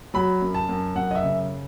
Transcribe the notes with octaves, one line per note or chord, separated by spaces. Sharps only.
F#3 B5
F#2
A5
F#2
F#2 F#5
D#5
E5
C#3